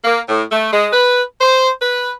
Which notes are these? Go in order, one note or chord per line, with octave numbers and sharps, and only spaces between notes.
A#3
A2
A3
G#3
B4
C5
B4